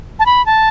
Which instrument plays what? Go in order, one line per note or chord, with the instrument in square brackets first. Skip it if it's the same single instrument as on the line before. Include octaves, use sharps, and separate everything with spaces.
[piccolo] A5
B5
A5